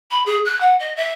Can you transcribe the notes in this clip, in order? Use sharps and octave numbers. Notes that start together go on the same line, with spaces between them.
B5
G#4
F#6
F#5
D#5
E5